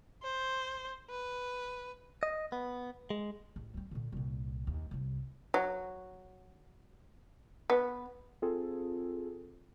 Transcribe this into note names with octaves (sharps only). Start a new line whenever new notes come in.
C5
B4
D#5
B3
G#3
A1
G3 C4
A#2 D3
C2 A#2
D#2
C2 G2
F#3
B3
C4 F4 G#4 A4